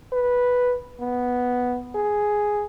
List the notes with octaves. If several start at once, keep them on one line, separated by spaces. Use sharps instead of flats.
B4
B3
G#4